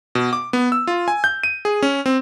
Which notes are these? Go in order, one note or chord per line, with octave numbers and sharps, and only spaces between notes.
B2
D6
B3
E6
F4
G#5
G6
D#7
G#4
C#4
C4